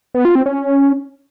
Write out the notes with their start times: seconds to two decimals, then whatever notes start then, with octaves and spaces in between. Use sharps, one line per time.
0.15 B3
0.25 F4
0.35 C4
0.46 C#4